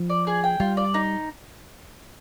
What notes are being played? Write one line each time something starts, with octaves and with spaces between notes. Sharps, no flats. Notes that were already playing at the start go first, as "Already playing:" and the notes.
Already playing: F3
D5
G#4
G5
G3 F4
D5
D#4